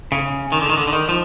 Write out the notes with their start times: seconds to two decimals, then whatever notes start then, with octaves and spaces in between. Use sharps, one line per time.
0.12 C#3
0.52 D#3
0.61 D3
0.70 D#3
0.77 D3
0.87 D3
0.93 D#3
1.09 F3